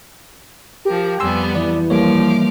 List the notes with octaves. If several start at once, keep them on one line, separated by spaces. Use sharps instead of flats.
F3 G4 A#4
F2 G3 B3 G#5 C6 E6
E3 D5
F3 G3 A#3 C#5 D6 F6